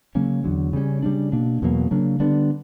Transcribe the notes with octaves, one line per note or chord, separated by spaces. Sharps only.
C#3 F#3 A#3 C#4
E2 D3 F#3
C#3 G3 C#4
C#3 G3 B3 D4
B2 A#3 D4
E2 B2 F#3 A#3
C#3 F#3 A#3 D4
D3 G3 B3 D4